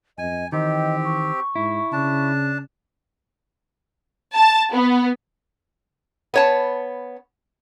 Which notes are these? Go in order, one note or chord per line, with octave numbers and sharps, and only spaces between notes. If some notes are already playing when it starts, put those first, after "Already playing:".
F2 D#5 G#5
D#3 E3 C4 G4 D#5
C#6
G#2 E4
C#3 D4 A5
A5
B3
B3 C#5 A5